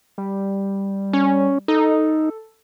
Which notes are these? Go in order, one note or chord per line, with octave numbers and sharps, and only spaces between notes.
G3
C#4
D#4 A4